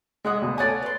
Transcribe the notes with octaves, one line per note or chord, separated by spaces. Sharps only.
G#3 E5 F#5 D#6
D2 B2
A3 C#5 D5 F#5 G#5 D#6
B4 D5 C6